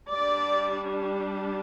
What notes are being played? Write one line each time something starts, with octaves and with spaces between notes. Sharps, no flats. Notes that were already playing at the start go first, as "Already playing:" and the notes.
G3 D4 D5